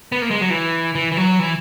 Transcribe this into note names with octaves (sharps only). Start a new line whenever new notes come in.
B3
A#3
G#3
F#3
E3
E3
E3
F#3
E3